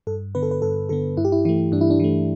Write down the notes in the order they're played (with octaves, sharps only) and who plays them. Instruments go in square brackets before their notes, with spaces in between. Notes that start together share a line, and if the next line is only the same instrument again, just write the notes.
[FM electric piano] G2 A4
D3 B3 B4
A4
B4
G2 A4
D3 B3 A4
G2 E4
G4
E4
E3 A3 E4
G2 D4
E4
D4
E3 A3